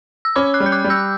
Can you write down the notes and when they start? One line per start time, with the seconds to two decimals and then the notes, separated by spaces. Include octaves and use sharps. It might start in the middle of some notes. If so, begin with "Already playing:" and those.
0.25 E6
0.36 C#4 B5 D6
0.54 D6 F#6
0.60 G3
0.66 G6
0.72 D6 F#6
0.84 G3
0.90 E6 G6